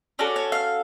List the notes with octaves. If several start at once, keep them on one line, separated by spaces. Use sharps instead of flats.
C#4 F#4 A4 D5
C#5
F5